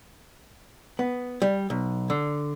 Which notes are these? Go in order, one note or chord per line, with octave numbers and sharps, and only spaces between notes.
B3
G3
B1
D3